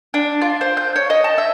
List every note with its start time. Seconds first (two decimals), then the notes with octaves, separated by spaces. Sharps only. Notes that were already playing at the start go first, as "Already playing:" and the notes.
0.14 D4
0.41 F4
0.61 C5
0.77 G6
0.96 C#5
1.10 D#5
1.24 A5
1.38 E5